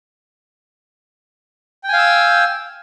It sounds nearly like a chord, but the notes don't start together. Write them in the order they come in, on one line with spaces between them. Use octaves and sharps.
G5 G#5 F5 E6